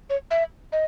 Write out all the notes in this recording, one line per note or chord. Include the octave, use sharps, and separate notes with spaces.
C#5
E5
D#5